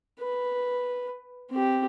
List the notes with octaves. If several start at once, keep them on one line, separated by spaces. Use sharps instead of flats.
B4
C4 G4